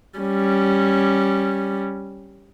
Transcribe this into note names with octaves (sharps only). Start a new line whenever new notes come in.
G3 C#4